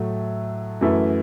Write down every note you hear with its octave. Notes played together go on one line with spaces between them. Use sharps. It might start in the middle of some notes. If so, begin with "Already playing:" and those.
Already playing: A2 F#3 A3
F#2 E3 A3 E4